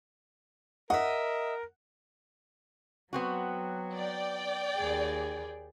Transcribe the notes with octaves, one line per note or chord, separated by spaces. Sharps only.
A#4 D#5 E5 F#5
F#3 B3 C4 F#4
D5 G5
D#2 G#4